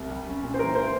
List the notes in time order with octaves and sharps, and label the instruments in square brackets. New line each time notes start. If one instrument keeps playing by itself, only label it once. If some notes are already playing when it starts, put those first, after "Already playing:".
Already playing: [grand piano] C2
G3
C#4
A#2
[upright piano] C5
[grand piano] E3 [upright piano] A#4
[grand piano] A#3 [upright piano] C5